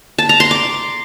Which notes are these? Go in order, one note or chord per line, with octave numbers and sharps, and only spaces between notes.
A5
A#5
C6
D6